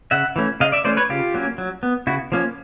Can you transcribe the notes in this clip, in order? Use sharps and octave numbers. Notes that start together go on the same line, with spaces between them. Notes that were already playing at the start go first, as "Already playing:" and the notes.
C#3 E5 F#5
E3 A3 C#4
C#3 D#5 F5
D5 E5
E3 A3 C#4 C5 D5
B4 C#5
C#3 F4 G4
F#3 A#3 C#4
F#3
B3
C#3 E4 F#4
F3 A#3 C#4